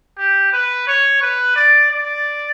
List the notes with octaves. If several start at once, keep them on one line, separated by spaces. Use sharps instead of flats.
G4
B4
C#5
B4
D5
D5